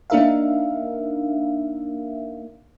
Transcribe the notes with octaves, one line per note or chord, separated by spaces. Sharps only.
A#3 D4 D#4 A#4 E5 F5